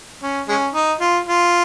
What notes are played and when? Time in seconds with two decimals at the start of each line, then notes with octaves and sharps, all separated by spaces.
0.23 C#4
0.49 G#3 C#4
0.74 D#4
1.00 F4
1.27 F4